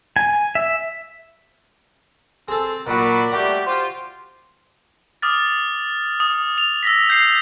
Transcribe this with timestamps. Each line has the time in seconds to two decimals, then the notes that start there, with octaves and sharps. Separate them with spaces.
0.16 G#5
0.55 E5
2.48 C4 G#4 A4
2.87 A#2 F#3 F#4 A#4 D5 B5
3.32 G3 A3 F#4 G4 D5
3.66 F4 G4 C5
5.22 D6 D#6 F6 A6
6.20 D#6
6.58 F7
6.83 E6 A#6 B6
7.10 G6 C7